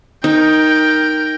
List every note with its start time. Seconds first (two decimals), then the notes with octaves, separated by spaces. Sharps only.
0.24 D#4 A#4 G5